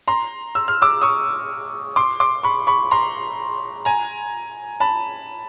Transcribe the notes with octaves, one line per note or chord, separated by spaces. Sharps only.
A#5 C6
E6
F6
D6 E6
C#6 D#6
C6 D6
C6 D6
B5 C#6
B5 C#6
A#5 C6
G#5 A#5
A5 B5